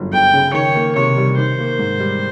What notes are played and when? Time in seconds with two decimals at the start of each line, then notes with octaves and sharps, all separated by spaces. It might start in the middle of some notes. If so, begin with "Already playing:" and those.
Already playing: G1 F#2
0.12 G1 G5
0.34 C#3
0.54 D#3 C#5
0.75 A#3
0.96 C3 C#5
1.17 G3
1.38 D#3 C5
1.59 A#3
1.79 G#2
2.00 G3